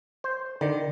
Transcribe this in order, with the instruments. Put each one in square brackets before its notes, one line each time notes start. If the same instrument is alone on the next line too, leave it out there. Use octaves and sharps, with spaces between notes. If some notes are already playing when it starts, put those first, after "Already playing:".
[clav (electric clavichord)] C5
[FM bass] D3 [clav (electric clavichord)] D#3 [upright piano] D5